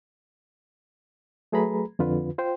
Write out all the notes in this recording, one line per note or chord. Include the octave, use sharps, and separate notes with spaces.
F#3 A3 G#4 B4 A#5 B5
F2 D3 F4 B4
F4 C5 G5